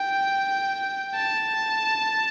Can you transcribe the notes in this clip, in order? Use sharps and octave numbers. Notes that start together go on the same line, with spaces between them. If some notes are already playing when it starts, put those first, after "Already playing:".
Already playing: G5
A5